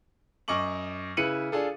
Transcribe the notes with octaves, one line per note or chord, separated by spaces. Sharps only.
F#2 D#5 C#6 D6 F#7
C#3 E4 B4 C#7 D#7 F#7
D4 F4 G#4 A4